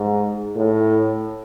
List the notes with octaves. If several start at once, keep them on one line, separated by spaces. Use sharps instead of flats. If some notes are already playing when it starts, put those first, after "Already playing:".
Already playing: G#2
A2